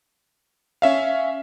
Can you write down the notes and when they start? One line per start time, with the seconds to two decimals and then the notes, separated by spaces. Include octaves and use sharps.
0.82 C#4 E5 F5